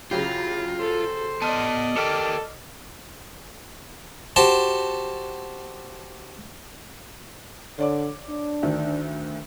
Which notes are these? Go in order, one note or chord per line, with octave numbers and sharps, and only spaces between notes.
C#3 F#3 E4 F4 G4
A4 C5
B3 D5 D#5 F#5 A5 F6 D#7
G4 A4 A#4 G5 D6 F6 C#7
F#4 G4 C5 A5
D3 C#5 D5 D6
D4
D2 D#3